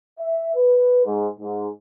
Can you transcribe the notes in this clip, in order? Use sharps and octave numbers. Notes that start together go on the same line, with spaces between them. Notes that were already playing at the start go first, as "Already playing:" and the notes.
E5
B4
G#2
G#2